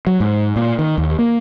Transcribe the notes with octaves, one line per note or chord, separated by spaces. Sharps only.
F#3
G#2
A#2
D#3
D#2
A#3